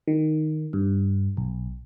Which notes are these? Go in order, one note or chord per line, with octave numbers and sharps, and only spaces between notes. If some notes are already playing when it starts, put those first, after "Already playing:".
D#3
G2
B1